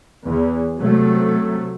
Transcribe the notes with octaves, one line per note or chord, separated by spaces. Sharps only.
E2
C3 F#3 A3